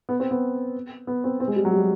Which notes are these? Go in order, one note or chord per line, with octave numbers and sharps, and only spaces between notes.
B3
C4
B3
B3
C4
C4
G#3
G3
F#3
G3